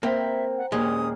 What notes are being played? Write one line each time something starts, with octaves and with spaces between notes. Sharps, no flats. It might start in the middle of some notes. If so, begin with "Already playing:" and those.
A#3 C4 C5 E5 G5 A#5 B5
F#5
D#2 A#2 G#3 C#4 D4 G4 B4 D#6